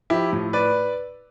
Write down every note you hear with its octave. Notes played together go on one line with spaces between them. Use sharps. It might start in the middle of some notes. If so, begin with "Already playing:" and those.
F3 E4 G4
A2
B4 D5